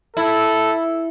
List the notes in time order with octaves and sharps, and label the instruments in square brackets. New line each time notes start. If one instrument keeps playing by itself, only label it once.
[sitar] E4 [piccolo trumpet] A4